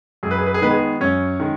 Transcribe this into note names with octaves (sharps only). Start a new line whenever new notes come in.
F#2 G#4
B4
G#4
B4
G#4
D#3 G#3 B3 D#4 B4
G#4
F#2 C#4 C#5
D#3 G#3